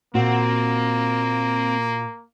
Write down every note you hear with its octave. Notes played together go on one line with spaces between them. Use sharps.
A#2 A#3 C4 F#4